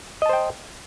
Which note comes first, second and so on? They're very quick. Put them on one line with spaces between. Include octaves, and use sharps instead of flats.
D#5 A5 C5 G5